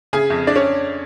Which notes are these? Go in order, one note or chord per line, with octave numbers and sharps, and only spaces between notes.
C#3 G#4 G#5
F2
D4 D5
C#4 C#5